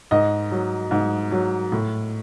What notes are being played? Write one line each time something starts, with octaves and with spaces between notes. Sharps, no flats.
G#2 D#5
F#3
G#2
F#3
A2